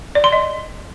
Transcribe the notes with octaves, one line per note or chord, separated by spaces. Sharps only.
D5
C6
D#5